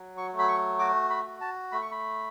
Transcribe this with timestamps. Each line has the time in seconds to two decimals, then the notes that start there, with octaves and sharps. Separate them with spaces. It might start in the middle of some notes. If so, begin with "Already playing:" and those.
Already playing: F#3
0.17 C#6
0.33 A3
0.39 B5
0.48 C#6
0.79 F#4 D6
1.10 B5
1.26 F#4
1.41 A5
1.72 A3 B5
1.82 C#6
1.92 B5